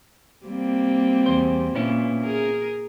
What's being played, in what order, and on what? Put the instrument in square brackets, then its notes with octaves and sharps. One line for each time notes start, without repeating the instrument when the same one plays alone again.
[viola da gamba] G3 A#3 C4
[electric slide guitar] E2 C5
[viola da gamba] A#2 [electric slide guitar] B3 C#4 E4
[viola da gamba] G#4 A#4